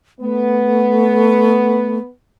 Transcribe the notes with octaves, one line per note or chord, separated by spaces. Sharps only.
A3 B3